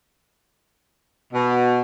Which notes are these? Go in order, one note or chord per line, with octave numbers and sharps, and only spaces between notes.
B2